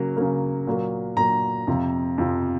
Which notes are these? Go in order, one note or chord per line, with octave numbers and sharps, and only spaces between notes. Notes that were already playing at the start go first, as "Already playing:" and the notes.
Already playing: C#3 F#3 A#3
C#3 F#3 A#3
A#2 F#3 A#3
A#2 F#3 A#3 A#5
F2 C3 F3
F2 C3 F3